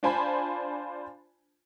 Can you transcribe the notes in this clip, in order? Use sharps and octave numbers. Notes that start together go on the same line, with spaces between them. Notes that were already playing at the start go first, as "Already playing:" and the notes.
D4 F4 C5 G#5 A5 B5